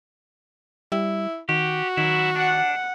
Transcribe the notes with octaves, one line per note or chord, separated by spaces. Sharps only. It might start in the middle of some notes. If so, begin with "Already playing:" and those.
G3 E4
D#3 F#4 G4
D#3 F#3 E4
D4 F#5